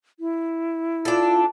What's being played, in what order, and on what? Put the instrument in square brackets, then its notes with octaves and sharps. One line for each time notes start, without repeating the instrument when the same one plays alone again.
[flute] E4
[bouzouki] D4 A4 [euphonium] F4